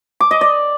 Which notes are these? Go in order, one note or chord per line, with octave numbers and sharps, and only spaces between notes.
D6
D#5
D5